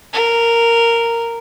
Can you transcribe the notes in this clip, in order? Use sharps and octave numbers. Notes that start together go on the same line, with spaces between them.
A#4